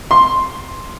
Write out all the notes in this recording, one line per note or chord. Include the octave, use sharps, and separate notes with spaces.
C6